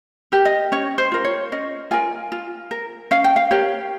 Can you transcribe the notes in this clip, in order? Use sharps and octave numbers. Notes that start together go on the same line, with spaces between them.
G4 A#4
D#5
C#4 C#5
C5
F4 A#4
C#5
C#4 D#5
F4 A#4 G#5
F4
A#4
C#4 F5
G5
F5
G4 A#4 C#5